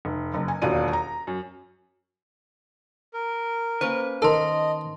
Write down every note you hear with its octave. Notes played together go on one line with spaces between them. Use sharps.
F1
F#1
G#5
E1 D#2 B2 F4 D5 D#7
A#5
F#2
A#4
A#3 C#4 B4 C5
D#3 A4 A#4 D#5 A5 C6